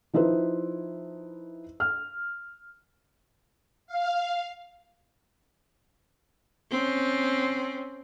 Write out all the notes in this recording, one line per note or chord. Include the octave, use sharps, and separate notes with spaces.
F3 D#4 E4 B4 C5
F6
F5
C4 C#4